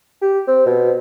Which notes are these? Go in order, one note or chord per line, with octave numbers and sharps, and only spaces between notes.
G4
C4
B2